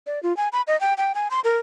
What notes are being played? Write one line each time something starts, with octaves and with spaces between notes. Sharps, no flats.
D5
F4
G#5
B5
D#5
G5
G5
G#5
C6
A#4